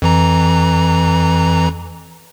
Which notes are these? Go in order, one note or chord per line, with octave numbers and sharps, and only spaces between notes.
F2 E3 A#5